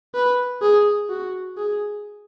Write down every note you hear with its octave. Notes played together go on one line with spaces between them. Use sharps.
B4
G#4
F#4
G#4